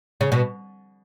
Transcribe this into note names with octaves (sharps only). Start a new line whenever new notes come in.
C#3
B2